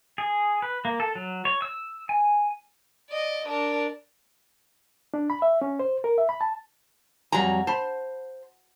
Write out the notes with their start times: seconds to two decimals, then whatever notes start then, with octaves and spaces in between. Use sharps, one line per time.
0.18 G#4
0.62 B4
0.85 A#3
1.00 A4
1.15 F#3
1.45 C#5
1.62 E6
2.09 G#5
3.10 D5 D#5
3.47 D4 A#4
5.14 D4
5.30 B5
5.42 E5
5.62 C#4
5.79 C5
6.04 A#4
6.18 E5
6.29 B5
6.41 A5
7.32 F2 F#3 G3 G#5 A#5
7.67 C5 A5 B5